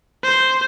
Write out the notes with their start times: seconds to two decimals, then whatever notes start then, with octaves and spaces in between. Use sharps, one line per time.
0.23 C5